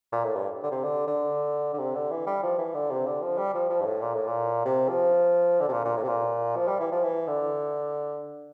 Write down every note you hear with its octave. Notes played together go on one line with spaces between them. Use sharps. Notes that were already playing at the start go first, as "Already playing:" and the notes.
A#2
A2
G2
D3
C3
D3
D3
D3
C3
D3
E3
G3
F3
E3
D3
C3
D3
F3
G3
F3
F3
G2
A2
A#2
A2
A#2
C3
F3
D3
C3
A#2
A#2
A2
C3
A#2
F3
G3
E3
F3
E3
D3